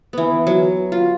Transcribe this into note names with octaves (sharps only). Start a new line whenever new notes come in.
E3 B3
F#3
F4